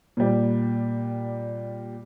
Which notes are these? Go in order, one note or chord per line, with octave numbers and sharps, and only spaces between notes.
A#2 G3